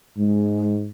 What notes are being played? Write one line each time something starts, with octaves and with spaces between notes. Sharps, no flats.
G#2 G#3